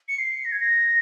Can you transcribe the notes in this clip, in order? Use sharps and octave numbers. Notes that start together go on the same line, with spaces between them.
C#7
C7
A#6
G#6
A#6